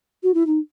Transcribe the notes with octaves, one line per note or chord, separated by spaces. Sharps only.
F#4
E4
D#4